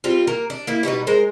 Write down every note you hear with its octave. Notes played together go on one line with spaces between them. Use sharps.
G3 C4 F4
A#3 A#4
D4
A#3 E4
B2 G3 D#4 B4
G#3 A#4 C5